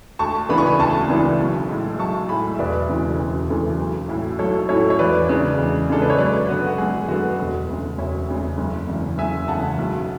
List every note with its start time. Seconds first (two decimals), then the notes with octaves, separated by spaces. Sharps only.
0.19 D2 A5 C#6
0.49 C#3 E3 B3 D4 B5
0.58 C#6
0.66 G#5 B5
0.79 D2 A5 C#6
1.09 C#3 E3 B3 D4
1.39 B1
1.69 A2 G#3
1.99 B1 A5 C#6
2.29 A2 G#3 G#5 B5
2.55 E5
2.59 E1 B4 D5
2.89 D2 C#3 E3 A3
3.19 E1
3.49 D2 C#3 E3 A3
3.78 B1
4.09 A2 F#3 C#4 E4
4.39 B1 A4 C#5
4.69 A2 F#3 C#4 E4 A4 C#5
4.90 C#5
4.99 E2 B4 D5
5.29 C#3 G#3 D4
5.59 E2
5.89 C#3 G#3 D4 A4
6.02 B4
6.10 C#5
6.18 F#2 B4 D5
6.49 D3 F#3 B3 F#4
6.67 F#4
6.78 F#2 G#4
7.08 D3 F#3 B3 F#4
7.39 E1
7.69 D2 C#3
7.98 E1 C#5 E5
8.28 D2 C#3
8.58 F#1
8.88 E2 C#3
9.18 F#1 E5 G#5
9.48 E2 C#3 F#5 A5
9.79 B1